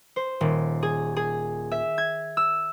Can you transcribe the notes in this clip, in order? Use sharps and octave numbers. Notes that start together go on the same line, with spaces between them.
C5
D#1
G#4
G#4
E5
G#6
E6